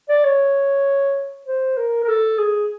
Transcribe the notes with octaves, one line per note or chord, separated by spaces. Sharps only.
D5
C#5
C5
A#4
A#4
A4
G#4